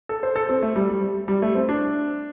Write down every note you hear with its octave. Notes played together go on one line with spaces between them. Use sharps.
A4
C5
A4
C4
A3
G3
G3
G3
A3
C4
D4